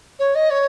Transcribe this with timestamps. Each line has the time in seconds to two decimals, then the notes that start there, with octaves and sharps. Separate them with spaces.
0.19 C#5
0.35 D#5
0.50 C#5